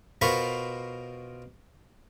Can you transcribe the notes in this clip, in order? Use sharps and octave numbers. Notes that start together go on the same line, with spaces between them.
B2 F4 A#4 C5 B5 C#6